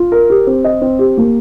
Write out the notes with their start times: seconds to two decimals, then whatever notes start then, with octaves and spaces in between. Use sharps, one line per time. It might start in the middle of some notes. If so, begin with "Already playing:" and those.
Already playing: F4
0.12 A#4
0.30 G4
0.47 C4
0.64 D#5
0.81 C4
0.99 G4
1.17 A#3